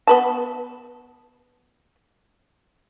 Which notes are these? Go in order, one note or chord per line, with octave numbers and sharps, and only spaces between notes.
B3 B4 A5